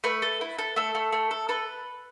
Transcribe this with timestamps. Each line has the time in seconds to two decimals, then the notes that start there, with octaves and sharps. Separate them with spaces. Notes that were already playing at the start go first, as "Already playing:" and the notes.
0.04 A3 B4
0.22 A4
0.41 E4
0.59 A4
0.76 A3 A4
0.95 A3
1.12 A3
1.31 A4
1.49 A4 B4